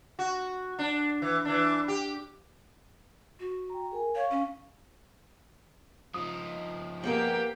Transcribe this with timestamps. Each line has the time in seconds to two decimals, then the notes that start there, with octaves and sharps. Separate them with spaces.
0.19 F#4
0.79 D4
1.22 E3
1.45 E3 D4
1.88 G4
3.39 F#4
3.70 G5 A#5
3.92 G#4 A#4 G#5
4.15 C#5 F5 C#6
4.30 C#4
6.14 F3 D#4 D#6
7.04 A#3 B3 G4 G#4 A#4 G5